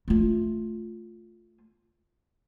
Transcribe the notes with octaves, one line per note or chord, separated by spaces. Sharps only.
A3 F4